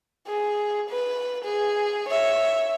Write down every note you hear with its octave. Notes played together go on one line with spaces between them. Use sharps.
G#4
B4
G#4
C#5 E5